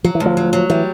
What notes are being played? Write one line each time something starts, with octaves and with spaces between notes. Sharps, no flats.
F3 F#3
E3
D2
F3
F#3
F#3
E3 G3